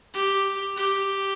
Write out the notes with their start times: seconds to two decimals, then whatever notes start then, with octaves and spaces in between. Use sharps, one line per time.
0.14 G4
0.77 G4